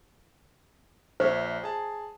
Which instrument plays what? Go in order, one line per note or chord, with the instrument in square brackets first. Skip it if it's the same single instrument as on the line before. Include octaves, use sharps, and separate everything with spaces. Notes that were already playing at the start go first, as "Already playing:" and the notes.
[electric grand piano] A#1 C#5 E5 [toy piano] C5
[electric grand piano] G#4 A5